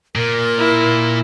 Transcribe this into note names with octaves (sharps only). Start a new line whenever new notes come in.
A#2 A#4
E4